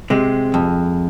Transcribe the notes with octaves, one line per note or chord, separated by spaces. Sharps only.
C3 G#3
F2